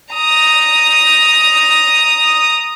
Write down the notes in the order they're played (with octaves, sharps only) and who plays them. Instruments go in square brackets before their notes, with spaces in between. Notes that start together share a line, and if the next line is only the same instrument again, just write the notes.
[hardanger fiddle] A#5 D#6